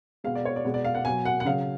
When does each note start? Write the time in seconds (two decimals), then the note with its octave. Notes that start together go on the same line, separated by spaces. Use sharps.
0.24 B2 G#3 F5
0.35 D5
0.45 C#5
0.56 D5
0.65 B2 G#3
0.74 D5
0.85 F5
0.95 F#5
1.05 B2 F#3 G#5
1.25 F#5
1.40 F#5
1.45 C#3 F#3 F5